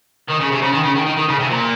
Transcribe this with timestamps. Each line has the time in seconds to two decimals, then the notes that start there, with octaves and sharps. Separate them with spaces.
0.28 D#3
0.40 C#3
0.51 C3
0.62 C#3
0.72 D#3
0.84 C#3
0.96 D#3
1.06 D#3
1.17 D#3
1.29 C#3
1.40 C3
1.50 A#2